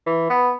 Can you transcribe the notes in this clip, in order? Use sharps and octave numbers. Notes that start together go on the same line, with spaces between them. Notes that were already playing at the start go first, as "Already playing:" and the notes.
E3
B3